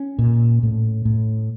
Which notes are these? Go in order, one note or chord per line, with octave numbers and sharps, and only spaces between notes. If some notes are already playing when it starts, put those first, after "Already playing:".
Already playing: C#4
A#2
A2
A2